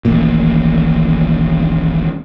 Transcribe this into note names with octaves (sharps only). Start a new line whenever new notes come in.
D#1 A1 A#2